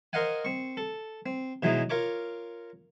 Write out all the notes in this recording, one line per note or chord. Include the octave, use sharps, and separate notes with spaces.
A#4 C5 D#5 F5 F#5 G#5
C4 C#6
A4
C4
B2 E3 F#3 G#3 D#4
F4 A#4 C#5 D6